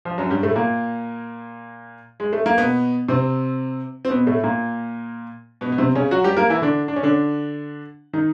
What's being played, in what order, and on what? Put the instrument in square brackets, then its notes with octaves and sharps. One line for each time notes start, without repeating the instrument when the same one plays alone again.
[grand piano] F3
F#2 F#3
G2 G3
A2 A3
A#2 A#3
G#3
A3
A#3
B2 B3
C3 C4
C4
B2 B3
A2 A3
A#2 A#3
B2 B3
B3
C3 C4
C#3 C#4
F#3 F#4
G3 G4
A#3 A#4
E3 E4
D3 D4
D4
C#4
D3 D4
D#3 D#4